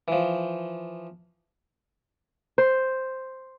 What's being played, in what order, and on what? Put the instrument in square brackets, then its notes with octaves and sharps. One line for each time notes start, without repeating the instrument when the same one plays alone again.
[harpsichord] E3 F3
[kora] C5